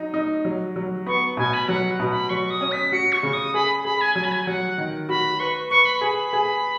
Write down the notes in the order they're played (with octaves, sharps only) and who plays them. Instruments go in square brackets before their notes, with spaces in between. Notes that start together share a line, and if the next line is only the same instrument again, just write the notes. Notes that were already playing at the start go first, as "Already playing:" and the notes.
Already playing: [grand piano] F#3 D#4
D#4
F#3
F#3
[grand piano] B3 [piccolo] C#6
[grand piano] B2 [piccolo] G#5
[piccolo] B5
[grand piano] F#3 [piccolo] F#5
[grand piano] B2
[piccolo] B5
[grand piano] F#3 [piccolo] C#6
[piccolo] D#6
[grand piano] C#4
[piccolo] B6
[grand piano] F#4 [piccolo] C#7
[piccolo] C#6
[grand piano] C#3
[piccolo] D#6
[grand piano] G#4 [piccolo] B5
[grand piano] G#4 [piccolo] B5
[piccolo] G#5
[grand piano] F#3 [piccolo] G#5
[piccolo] B5
G#5
[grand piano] F#3 [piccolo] F#5
[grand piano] D#3
[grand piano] F#4 [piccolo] B5
[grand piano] B4 [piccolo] C#6
[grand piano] B4 [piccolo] C#6
[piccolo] B5
[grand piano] G#4 [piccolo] B5
[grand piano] G#4